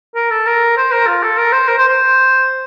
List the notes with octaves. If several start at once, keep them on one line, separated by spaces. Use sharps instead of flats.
A#4
A4
A#4
C5
A#4
F4
A4
A#4
C5
A#4
C5
C5